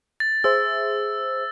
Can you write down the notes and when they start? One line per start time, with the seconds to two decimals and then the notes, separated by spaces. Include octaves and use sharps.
0.20 A6
0.44 G#4 C5 E5 E6